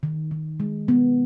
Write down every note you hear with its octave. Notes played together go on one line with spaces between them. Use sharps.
D#3
D#3
G#3
B3